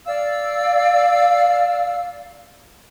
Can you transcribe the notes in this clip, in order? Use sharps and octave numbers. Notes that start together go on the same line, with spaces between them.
D5 F5 E6